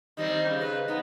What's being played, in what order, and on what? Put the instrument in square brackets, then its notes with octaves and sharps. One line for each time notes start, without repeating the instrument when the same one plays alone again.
[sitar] D#3 G3 C4 [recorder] D#5
[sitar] C#3
[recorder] B4
[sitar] B3 [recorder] D#4